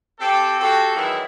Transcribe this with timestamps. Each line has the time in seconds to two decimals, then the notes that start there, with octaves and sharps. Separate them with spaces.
0.20 C4 G4 A4
0.59 C4 F#4 G4 A4
0.95 D#3 E3 F#3 G#3 E4